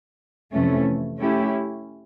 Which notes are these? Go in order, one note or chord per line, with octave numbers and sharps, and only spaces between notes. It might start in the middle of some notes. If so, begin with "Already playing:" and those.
F2 C3 E3 A3 C#4
A3 C#4 E4 G4